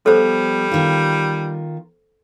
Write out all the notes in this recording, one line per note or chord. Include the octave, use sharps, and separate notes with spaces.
F3 G3 B3 A4 C5
D#3 F4